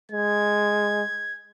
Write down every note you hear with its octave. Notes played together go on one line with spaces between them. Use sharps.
G#3 G#6